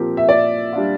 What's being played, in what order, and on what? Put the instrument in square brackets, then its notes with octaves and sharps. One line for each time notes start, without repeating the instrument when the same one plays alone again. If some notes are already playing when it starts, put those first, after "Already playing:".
Already playing: [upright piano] A#2 F3 C4 G4 A#4
[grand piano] E5
[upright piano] A#2 [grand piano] D5
[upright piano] G3 D4 F4